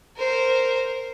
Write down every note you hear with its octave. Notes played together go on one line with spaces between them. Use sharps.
A#4 C5